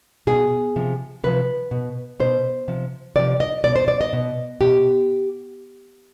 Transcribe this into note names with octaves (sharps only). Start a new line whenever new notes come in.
B2 G#4
C3 F3
C3 F3 B4
B2
B2 C5
C3 F3
C3 F3 D5
D#5
B2 D5
C5
D5
D#5
B2
B2 G4